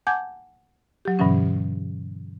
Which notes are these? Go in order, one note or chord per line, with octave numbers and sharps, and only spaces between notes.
F#5 G#5 A5 D6 G6 G#6
F#3 G4
G2 B2 D3 E3 F#3 C#4